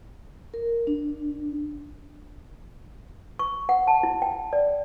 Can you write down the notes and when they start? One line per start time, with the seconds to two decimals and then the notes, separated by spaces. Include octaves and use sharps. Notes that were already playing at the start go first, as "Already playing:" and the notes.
0.54 A#4
0.87 D4
3.39 C#6
3.69 F#5
3.87 A5
4.03 E4
4.22 G5
4.53 D5